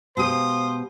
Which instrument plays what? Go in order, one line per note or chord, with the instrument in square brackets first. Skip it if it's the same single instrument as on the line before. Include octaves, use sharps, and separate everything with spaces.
[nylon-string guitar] B2 G#3 G4 [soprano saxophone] C5 [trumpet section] F5 D#6